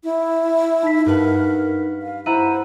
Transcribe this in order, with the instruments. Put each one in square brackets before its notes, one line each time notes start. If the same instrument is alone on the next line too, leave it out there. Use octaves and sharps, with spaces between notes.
[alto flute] E4
[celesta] D#4 B6
[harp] G2 B4 F#5 [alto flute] A#4
[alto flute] F5
[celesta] E4 A#5 D#7 [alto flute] C5 [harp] E5 F#5 B5